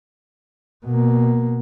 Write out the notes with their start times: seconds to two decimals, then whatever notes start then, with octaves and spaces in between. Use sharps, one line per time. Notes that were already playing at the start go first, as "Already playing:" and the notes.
0.86 B2 A#3